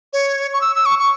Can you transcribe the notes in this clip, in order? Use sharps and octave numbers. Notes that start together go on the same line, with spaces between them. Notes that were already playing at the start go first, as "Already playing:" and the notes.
C#5
C#6
E6
E6
C#6
C#6